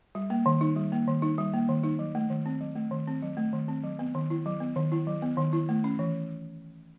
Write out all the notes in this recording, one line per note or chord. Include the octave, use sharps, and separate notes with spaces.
G3
A#3
D#3
D#4
G3
A#3
D#3
D#4
G3
A#3
D#3
D#4
F#3
A3
D#3
C4
F#3
A3
D#3
C4
F#3
A3
D#3
C4
F#3
B3
D#3
E4
F#3
B3
D#3
E4
F#3
B3
D#3
E4
A3
C#4
E3